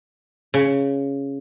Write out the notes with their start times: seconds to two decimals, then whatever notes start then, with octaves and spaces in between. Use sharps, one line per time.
0.54 C#3